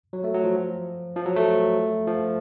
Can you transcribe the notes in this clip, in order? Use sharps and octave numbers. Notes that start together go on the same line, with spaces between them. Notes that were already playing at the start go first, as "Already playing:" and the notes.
F#3
A3
F#3
F3
F3
F#3
A3
F3